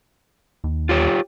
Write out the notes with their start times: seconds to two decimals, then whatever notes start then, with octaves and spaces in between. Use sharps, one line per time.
0.64 D#2
0.89 F4 G4 C#5